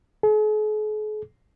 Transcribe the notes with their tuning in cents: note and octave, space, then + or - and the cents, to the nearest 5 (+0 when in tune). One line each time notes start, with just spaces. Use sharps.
G#4 +45